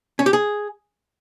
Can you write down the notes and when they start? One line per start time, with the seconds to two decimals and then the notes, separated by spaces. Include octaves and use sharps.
0.19 C#4
0.26 G4
0.33 G#4